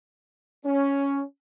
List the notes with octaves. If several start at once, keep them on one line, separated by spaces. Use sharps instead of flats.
C#4